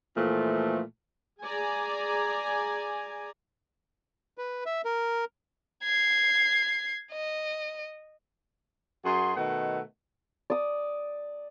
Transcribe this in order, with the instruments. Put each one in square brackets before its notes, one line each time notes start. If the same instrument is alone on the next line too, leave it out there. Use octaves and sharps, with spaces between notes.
[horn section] A#2 E3 F3 A3
[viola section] G#4 D5 G#5 A#5
[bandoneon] B4
E5
A#4
[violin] G#6 C7
D#5
[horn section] F#2 F#4 G#4 C6
B2 D#3 A3 F#5
[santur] D5 D#6